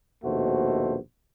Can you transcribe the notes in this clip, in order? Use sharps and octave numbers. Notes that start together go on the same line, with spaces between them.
A#1 D#2 B2 A3 F#4 C5